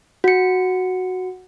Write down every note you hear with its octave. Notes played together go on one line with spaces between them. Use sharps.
F#4 C#7